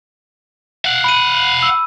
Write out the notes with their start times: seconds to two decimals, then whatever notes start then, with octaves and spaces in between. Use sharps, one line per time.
0.85 F5 F#5
1.04 B5 D#7
1.63 E6